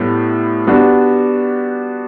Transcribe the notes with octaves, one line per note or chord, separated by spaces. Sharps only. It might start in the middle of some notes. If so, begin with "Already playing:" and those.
Already playing: A2 G3 B3
G3 B3 D4 F#4